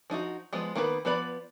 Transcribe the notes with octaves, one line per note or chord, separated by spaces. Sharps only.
F3 D#4 F4 F#4
F3 G#3 B3
D#3 A#3 B3 B4
F3 B3 B4 D5 B5